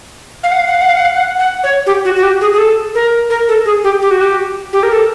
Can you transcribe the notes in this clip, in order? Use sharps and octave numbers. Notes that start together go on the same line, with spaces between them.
F5
F#5
F5
F#5
F5
F#5
F5
F#5
F5
F#5
F#5
C#5
G4
F#4
F#4
G4
G#4
G#4
A4
A#4
A#4
A4
G#4
G4
G4
F#4
G4
G4
A#4
A4